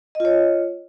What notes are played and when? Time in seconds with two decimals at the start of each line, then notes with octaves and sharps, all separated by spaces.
0.15 D#5
0.20 F4
0.25 C#5